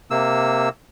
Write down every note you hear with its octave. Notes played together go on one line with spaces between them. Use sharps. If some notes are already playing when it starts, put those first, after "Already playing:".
C3 A#3 E6